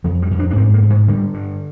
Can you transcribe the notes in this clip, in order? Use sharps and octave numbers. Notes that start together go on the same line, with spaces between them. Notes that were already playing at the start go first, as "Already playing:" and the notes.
F2 F3
G3
F2
D4
D4
G#2 C4
A#3
G#2
G#3
D3 G3
G2